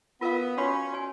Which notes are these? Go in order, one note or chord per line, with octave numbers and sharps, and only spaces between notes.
B3 F4 A#4 F5
C#4 F#4 C#5 F5 B5
F#4 C#5 G#5